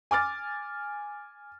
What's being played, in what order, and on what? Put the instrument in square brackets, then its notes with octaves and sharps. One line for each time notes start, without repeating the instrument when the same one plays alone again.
[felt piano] G#5 D6 F6 A6